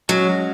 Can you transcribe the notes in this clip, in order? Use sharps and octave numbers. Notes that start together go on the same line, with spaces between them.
F#3 G#3 C#4 F#4